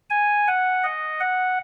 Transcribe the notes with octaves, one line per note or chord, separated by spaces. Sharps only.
G#5
F#5
D#5
F#5